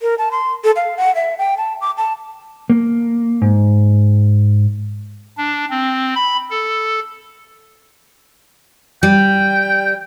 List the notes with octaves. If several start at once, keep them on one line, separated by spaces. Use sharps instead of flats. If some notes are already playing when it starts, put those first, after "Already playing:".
A#4
A5
C6
A4
F5
F#5
E5
G5
A5
D6
A5
A#3
G#2
D4
C4
B5
A4
G3 G5